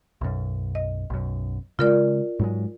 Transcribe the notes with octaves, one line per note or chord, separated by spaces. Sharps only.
B1 F#2
D#5
B1 F#2
C#3 G#3 F4 A#4 D5
G#2 F#3 G#3